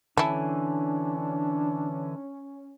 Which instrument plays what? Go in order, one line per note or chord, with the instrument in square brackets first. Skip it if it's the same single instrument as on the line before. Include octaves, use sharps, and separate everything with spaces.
[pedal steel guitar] D3 E3 G#5 [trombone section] C#4 [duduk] D4 [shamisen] E4 A4